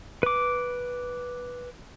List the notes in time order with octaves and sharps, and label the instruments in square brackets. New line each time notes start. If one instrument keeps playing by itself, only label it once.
[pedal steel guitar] B4 D6